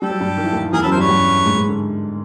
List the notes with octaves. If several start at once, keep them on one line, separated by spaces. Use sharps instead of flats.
G3 G4 A4
F#3
G2 G3
D#3
E3
D#2 D#3
E2 E3 G#4 A#4
F#2 F#3 A4 B4
A#4 C5
G2 G3 B4 C#5
G2 G3
G#2 G#3
G#2 G#3
D3